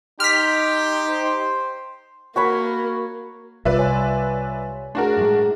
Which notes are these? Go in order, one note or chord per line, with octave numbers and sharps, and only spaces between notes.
D#4 G4 C6 F6 B6
C5
A#3 F#4 C#5 B5
C2 G3 F4 B4 D5 E5
C#5 G#5 C6
A3 D4 F#4 G#4 A#4
A2 G#3